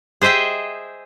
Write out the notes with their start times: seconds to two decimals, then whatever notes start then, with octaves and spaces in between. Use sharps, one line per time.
0.21 G#4 C5 D#5 E5 G5